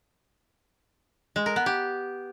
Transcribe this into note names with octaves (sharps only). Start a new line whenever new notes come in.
G#3
A#4
B3
G4